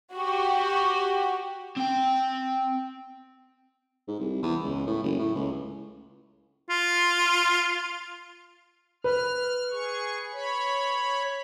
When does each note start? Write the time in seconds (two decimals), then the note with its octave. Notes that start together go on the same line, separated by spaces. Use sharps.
0.14 F#4 G4
1.77 C4 G5
4.08 G#2
4.20 C2
4.43 E2
4.63 C#2
4.86 A2
5.03 F#1
5.19 A2
5.35 C#2
6.69 F4
9.04 B4 F6
9.71 G#4 C#6
10.33 C#5 B5